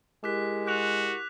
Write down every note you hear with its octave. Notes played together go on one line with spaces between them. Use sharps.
G#3 E4 G4 A#4 D6 F#6 B6
F#4 F#6 F7